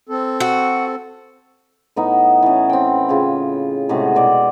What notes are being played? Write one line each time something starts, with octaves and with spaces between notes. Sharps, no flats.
C4 A4
F#4
A2 B3 D#4
E3 C#4
C4 G5
C#3 F4
A2 C3 G#3 F#4
B2 D5